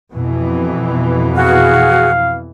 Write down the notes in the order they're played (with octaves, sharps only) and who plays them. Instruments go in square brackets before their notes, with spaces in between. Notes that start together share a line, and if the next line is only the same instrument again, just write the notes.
[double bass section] F2 B2 E3
[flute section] F#4 G#4 [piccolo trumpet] F5